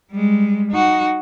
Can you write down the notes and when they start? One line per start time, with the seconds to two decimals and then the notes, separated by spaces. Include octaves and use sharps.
0.11 G3 G#3
0.71 D#4 F#4